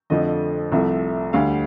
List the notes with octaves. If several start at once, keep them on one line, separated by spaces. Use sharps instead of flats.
F2 D3 F3 A3 D#5
C2 C3 F3 A3 E5
D2 D3 G3 F5